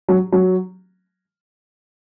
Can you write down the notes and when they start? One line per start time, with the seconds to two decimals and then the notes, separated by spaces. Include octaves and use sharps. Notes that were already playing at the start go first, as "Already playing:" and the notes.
0.08 F#3
0.32 F#3